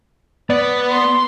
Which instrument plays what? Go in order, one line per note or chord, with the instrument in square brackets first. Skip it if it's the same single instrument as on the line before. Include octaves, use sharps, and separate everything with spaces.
[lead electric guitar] B3 [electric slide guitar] D5
[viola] C6